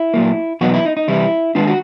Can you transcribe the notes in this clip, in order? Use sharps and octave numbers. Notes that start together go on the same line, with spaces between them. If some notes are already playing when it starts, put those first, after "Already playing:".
Already playing: E4
A#2 F#3 A#3
E2 B2 F#3 B3 D#4 F#4
E4
D#4
D#4
C3 E3 G3 E4
D#3 G#3 B3 D4 F4
F#4